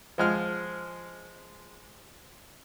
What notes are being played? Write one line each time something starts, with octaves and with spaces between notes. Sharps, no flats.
F3 G#3 F6